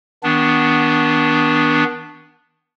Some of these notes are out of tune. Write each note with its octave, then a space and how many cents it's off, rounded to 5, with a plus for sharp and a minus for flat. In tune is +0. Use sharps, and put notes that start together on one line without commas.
D#3 +35 B3 +0 D4 +0